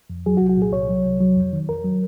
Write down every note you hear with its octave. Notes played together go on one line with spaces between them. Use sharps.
F2
F#3 G#4
F#4
C2
F#4
A#2 G#4
C2 C#5
F#3
C2
F#3
F2
D#3
F2 A#4
F#3